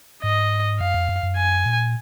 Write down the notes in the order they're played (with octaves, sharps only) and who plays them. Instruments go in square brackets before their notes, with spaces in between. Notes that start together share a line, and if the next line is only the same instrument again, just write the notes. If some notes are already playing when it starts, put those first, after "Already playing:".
[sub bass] G#2 [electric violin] D#5
[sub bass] F#2 [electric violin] F5
[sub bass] F2
F#2
F#2
[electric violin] G#5
[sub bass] A#2